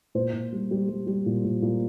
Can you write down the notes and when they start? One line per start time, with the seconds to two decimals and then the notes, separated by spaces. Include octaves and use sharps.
0.15 A#2 C5
0.33 A#2
0.52 G3
0.71 G3
0.88 G3
1.07 G3
1.26 A#2
1.45 A#2
1.62 A#2